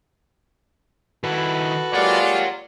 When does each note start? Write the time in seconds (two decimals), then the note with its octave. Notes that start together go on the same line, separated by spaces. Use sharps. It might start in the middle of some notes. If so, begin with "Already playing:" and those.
1.23 D#3 E4 F#4 A4 B4
1.93 G#3 A#3 F4 G4 C#5 D5 F#5